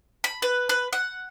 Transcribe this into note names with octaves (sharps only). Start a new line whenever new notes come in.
B5
B4
B4
F#5